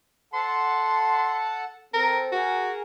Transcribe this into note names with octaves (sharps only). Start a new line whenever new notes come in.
A4 F#5 A5 C6
C4 A4 A#4
F#4 G#4 A#4